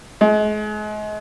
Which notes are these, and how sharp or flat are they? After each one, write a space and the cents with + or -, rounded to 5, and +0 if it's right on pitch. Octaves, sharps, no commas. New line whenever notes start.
G#3 +35